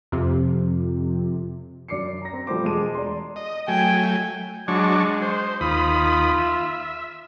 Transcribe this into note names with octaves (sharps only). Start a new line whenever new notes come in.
F2 C3
F#2 D5 D6 C7 C#7
A#5 A#6
C4
B2 F3 G3 A3 C5 D6
E1 G#3 A5 D6 D#7
D5 A#5 C6
D#5
F#3 A3 G5 G#5
F#3 G#3 D4 C#6
C5
D#2 F4 B5 D#6
E5